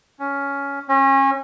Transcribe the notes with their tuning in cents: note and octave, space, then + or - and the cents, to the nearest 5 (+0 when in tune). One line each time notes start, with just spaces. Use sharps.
C#4 +10
C#4 -30